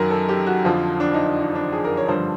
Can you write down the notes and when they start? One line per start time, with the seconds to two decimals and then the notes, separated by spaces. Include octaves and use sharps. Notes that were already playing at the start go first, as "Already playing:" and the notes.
Already playing: F#2 D#3 F#3 A#4
0.10 A4
0.29 G4
0.47 F#4
0.64 F2 D3 F3 F4
1.00 D4
1.14 D#4
1.28 D4
1.42 D#4
1.55 D4
1.73 G#4
1.84 A#4
1.97 C#5
2.08 G2 D3 F3 C5